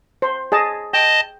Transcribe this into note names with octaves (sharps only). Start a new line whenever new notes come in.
C5
G#4 D#5 A5
D#5 G5 A5